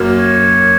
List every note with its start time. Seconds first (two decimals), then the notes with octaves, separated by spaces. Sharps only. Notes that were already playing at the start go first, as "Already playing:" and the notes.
Already playing: F#2 F#3 A#3
0.17 C#5